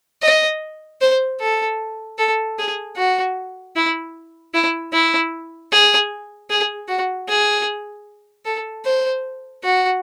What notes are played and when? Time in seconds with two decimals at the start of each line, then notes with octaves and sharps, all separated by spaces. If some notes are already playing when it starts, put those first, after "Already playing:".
0.22 D#5
1.01 C5
1.40 A4
2.18 A4
2.58 G#4
2.97 F#4
3.76 E4
4.54 E4
4.93 E4
5.72 G#4
6.50 G#4
6.88 F#4
7.28 G#4
8.45 A4
8.85 C5
9.63 F#4